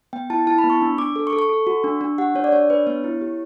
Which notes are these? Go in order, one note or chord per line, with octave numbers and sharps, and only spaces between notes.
B3 G5
E4 A5
E4 A5
B5
B3
C#6
D4
D4 D6
A4
C#6
A4
C#6
A4
F#4
D4
D4
G4 F#5
D4 C#5
D5
D4 C#5
D4 B4
B3 C#5
E4
G4